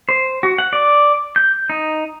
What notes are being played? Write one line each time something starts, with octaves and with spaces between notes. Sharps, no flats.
C5
F#4
F#5
D5
G6
D#4